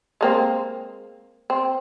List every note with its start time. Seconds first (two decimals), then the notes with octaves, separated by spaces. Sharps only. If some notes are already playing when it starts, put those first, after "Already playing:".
0.21 G#3 A#3 C4
1.50 C4